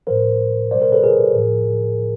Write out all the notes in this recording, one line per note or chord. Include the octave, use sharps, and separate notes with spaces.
A2 F3 A#4 C5
B2 G3 C5 D5
A#4 C5
A4 B4
G#4 A#4
A2 F3